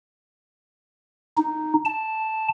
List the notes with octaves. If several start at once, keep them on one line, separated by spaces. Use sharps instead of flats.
D#4
A5